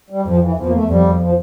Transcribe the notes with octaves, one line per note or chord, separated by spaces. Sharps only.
G3
F2 F3
E3
E2 F3
A#3
A3
F2 G3
F3